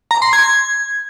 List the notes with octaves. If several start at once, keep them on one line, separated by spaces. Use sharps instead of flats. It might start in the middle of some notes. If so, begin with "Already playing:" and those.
A#5
C6
G#6